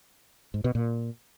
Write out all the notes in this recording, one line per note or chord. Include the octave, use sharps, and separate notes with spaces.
G#2
B2
A#2